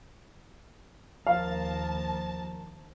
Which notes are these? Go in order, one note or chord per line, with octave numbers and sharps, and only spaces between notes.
D#2 F3 A#4 F5 A5